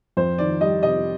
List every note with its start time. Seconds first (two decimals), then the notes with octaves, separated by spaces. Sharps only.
0.17 F2 C5
0.38 D#3 D5
0.61 G3 D#5
0.83 C3 D#5